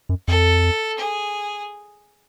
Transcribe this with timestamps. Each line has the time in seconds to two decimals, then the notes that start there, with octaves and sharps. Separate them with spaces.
0.09 F#2
0.28 F2 A4
0.98 G#4